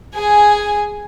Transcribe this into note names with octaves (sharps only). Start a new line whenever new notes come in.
G#4 G#5